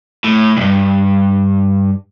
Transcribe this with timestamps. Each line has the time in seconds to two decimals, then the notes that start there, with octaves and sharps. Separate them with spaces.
0.24 A2
0.57 C2 G2